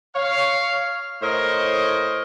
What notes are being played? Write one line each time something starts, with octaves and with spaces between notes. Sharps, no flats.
C#5 F5
A2 A#4 C5 C#5 D#5